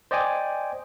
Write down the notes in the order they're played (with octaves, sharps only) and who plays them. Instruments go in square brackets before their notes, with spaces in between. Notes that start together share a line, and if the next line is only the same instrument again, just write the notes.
[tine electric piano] C5 D5 D#5 G5 G#5 D6